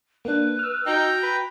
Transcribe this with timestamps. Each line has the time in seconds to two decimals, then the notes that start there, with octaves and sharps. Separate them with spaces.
0.25 A#3 D4 B4
0.59 E6 F6
0.86 D#4 F#4 G5 A#5
1.23 B4